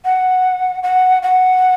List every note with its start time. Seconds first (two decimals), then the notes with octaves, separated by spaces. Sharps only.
0.05 F#5
0.83 F#5
1.22 F#5